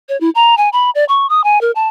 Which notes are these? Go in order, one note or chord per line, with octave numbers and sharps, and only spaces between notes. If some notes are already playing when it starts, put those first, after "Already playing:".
C#5
E4
A#5
G#5
B5
D5
C#6
D#6
G#5
A#4
A5